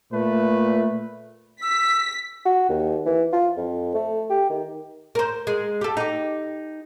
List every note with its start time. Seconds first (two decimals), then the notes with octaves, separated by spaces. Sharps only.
0.12 A#2 A3 B4
1.62 E6 B6
2.46 F#4
2.69 D#2
3.06 E3
3.33 F4
3.57 F2
3.94 A3
4.30 G4
4.50 D#3
5.15 A#4 C5
5.47 G#3
5.81 G4 A4
5.97 D#4 G4